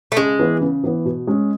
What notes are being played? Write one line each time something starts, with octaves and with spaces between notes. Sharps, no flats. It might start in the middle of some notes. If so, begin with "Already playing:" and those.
A3
C#3 G#3
E3 B3
C#3
E3 B3
B2
G#3 C#4